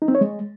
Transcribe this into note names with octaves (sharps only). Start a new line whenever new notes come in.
D#4
C4
C#5
G#3